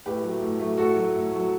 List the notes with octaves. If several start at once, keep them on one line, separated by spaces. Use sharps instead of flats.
A2 G4 B4
F#3 A3
A2
F#3 A3
A2 F#4 A4
F#3 A3
A2
F#3 A3